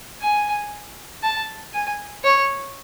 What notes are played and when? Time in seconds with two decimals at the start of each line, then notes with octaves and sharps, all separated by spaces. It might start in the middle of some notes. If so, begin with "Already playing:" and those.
0.21 G#5
1.23 A5
1.74 G#5
2.24 C#5